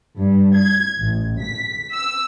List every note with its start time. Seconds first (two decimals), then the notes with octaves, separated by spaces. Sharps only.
0.18 G2
0.53 G#6
1.00 A1
1.41 B6
1.92 E6